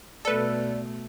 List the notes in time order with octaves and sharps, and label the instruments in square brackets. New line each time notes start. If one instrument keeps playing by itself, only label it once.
[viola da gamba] B2 A3 [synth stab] A4 B4 [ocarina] D5